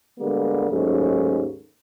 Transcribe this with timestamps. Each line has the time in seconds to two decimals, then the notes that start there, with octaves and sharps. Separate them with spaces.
0.19 D3 G3 G#3 A#3 B3
0.70 D#2 G#2 F#3 A3 C#4